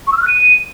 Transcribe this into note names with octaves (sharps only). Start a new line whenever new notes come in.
C#6
E6
F6
F#6
D#7